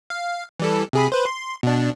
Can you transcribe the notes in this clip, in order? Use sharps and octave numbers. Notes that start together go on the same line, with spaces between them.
F5
E3 G3 A4
C3 G#4 B5
B4 C5
C6
B2 D4